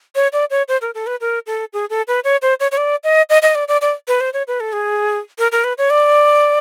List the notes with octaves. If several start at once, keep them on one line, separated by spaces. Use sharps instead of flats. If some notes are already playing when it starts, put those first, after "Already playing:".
C#5
D5
C#5
C5
A#4
A4
B4
A#4
A4
G#4
A4
B4
C#5
C5
C#5
C#5
D5
D#5
D#5
D#5
D5
D5
D5
B4
C5
C#5
B4
A4
G#4
A#4
A#4
B4
C#5
D5